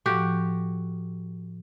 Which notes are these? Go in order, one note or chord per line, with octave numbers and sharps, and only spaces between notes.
A2 F3 F#4 G4